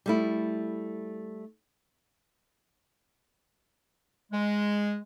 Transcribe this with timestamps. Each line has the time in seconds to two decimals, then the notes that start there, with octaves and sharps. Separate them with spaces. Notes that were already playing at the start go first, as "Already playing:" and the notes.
0.06 G3 A3 E4
4.32 G#3